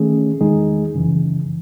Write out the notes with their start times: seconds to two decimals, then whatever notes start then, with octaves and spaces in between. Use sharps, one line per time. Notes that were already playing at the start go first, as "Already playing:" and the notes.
Already playing: D#3 A3 C#4 G#4
0.41 E2 D#3 G#3 D#4 G#4
0.95 F#2 C#3 E3